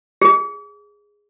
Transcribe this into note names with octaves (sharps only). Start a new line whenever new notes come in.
G#4